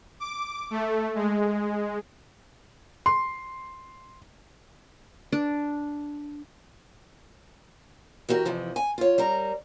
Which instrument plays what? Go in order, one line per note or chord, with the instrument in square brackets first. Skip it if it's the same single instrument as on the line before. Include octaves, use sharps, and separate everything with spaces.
[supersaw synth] D6
A3
G#3
[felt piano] C6
[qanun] D4
[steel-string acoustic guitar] E3 F#4 G4 A#4
F2 C3 E3 F3
G#5
F4 C#5
G3 A#4 A#5